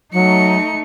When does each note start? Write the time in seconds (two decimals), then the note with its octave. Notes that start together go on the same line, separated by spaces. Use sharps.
0.14 F#3 A3 D#4 C#7